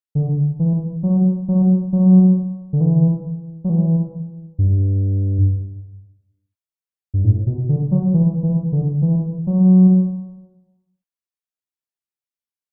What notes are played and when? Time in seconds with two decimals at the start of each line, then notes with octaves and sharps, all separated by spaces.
0.15 D3
0.59 E3
1.03 F#3
1.48 F#3
1.93 F#3
2.73 D3
2.81 E3
3.64 F#3
3.70 E3
4.59 G2
7.14 G2
7.24 A2
7.47 B2
7.69 D3
7.91 F#3
8.14 E3
8.43 E3
8.72 D3
9.02 E3
9.47 F#3